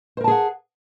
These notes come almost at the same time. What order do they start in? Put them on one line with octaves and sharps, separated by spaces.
C5 A#4 A5 G#4 F#5